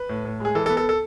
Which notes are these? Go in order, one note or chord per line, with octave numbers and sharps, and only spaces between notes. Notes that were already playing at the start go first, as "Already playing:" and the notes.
Already playing: B4
A2
A2
G#3 G#4
E3 A4
A4
B3
A4
A4